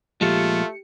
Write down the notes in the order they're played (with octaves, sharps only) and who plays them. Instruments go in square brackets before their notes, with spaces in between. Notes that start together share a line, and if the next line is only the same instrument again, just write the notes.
[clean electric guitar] A#2 F3 G#3 [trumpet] A3 [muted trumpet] F4 [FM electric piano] G4 C#7